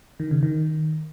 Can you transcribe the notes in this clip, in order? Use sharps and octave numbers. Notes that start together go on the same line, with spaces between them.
D#3
C#3
D#3